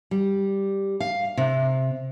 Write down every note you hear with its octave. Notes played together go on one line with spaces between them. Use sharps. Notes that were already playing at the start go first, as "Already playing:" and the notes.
G3
F5
C3